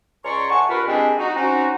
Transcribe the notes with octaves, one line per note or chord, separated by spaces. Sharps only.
C#2 C#5 D5 A#5 C6 C#6
A2 F#5 G#5 A5 C#6
G2 F4 A#4 B4
G#3 C4 D4 G4
D#4 F#4
F#3 C4 C#4 D#4 F#4